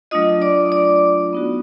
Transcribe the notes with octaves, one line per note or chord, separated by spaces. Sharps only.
F#3 A3 D4 F4 D#5 D#6
D5 D6
D5 D6
B3 D#4 F#4